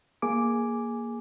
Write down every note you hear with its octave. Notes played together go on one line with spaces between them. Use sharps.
A#3 G#4 G#5 D6